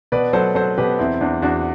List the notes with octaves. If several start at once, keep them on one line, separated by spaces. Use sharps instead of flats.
B2 B4 D5
F#3 A4 C5
F#3 A4 C5
B2 G4 B4
E2 C4 E4
E2 D4
E2 D4 F#4